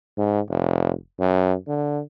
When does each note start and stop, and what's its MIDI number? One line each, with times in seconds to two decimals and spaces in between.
0.17 0.40 44
0.49 0.92 29
1.20 1.54 42
1.67 2.00 50